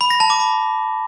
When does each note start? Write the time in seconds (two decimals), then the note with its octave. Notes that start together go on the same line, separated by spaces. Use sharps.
0.01 B5
0.10 A#6
0.20 A5
0.30 D6
0.40 B5